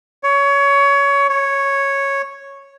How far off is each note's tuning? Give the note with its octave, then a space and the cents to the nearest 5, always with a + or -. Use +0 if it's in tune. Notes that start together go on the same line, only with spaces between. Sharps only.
C#5 +20
C#5 -5